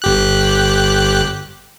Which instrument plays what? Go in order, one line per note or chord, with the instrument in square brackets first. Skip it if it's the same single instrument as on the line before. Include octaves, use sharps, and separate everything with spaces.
[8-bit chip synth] G1 G4 F#6